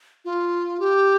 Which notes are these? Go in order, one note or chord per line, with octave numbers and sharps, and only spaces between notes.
F4
G4